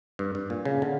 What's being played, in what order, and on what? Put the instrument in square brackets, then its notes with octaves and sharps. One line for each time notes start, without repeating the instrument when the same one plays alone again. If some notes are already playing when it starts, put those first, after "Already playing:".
[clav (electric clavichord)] G2
G2
A#2
C#3
D3